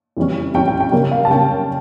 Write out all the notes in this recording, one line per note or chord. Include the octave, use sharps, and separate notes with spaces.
F2 E3 G3 C#4
F2 E3 G3 C#4 G5
G5
G5
C#3 G3 A#3 C#4 G5
F5
A5
C#3 G3 A#3 C#4 G5